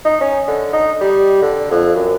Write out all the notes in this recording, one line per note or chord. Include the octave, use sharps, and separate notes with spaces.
D#4
C#4
D3
D#4
G3
D3
F2
F#2